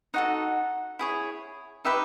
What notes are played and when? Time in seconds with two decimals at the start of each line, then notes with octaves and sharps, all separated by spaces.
0.14 D#4 F#4 A4 F#5
0.99 E4 G#4 C#5
1.85 D#4 G4 B4 E5